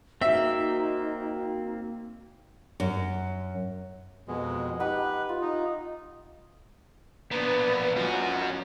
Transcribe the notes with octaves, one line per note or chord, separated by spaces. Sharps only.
A#3 C4 D#4 F#4 E5
F#2
F2 B2 G#3
D#4 G4 B4 F#5
F4
D#4
A#3 B3 D4
F#2 F3 C#4 F#4